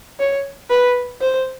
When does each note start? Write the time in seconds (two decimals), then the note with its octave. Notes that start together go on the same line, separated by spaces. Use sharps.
0.19 C#5
0.70 B4
1.21 C5